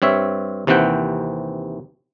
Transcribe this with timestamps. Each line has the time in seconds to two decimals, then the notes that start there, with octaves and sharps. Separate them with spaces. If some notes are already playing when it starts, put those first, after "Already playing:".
0.02 G2 C4 C#5 E5
0.67 D#2 C3 E3 C4 F#5 G5